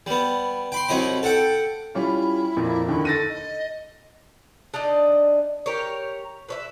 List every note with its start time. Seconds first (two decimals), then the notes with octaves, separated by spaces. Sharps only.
0.06 G3 B3
0.72 G5 B5 C6
0.88 C2 F#3 D#4 D#5 B5
1.23 A4 F#5 G5
1.95 G3 C#4 E4 F4
2.57 F2 A#2 A#3
2.88 D#2 D3 D#3 E4
3.05 A4 A6 A#6 D#7
3.29 D#5
4.74 D4 D#4 D5 D#5
5.66 G4 A#4 C#5
6.48 B4 C#5 E5